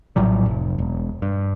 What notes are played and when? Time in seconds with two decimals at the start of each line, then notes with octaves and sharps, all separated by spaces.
0.16 A#1 A2 F#3 G3
0.46 F1
0.78 E1
1.22 G2